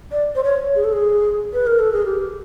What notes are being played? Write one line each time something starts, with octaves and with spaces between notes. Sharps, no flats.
D5
C5
C#5
G#4
A4
G#4
B4
A#4
A4
G#4
G4